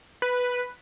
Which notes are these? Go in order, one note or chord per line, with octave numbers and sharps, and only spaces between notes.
B4